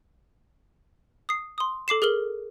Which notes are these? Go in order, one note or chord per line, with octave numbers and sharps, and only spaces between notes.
D#6 C7
C6 D#6
A4 D6 C7 E7
G#4 A#4 F6 F#7 G7